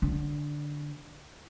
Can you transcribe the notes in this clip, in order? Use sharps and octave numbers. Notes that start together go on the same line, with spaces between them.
D3